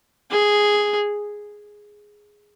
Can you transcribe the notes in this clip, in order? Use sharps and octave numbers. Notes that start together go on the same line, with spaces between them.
G#4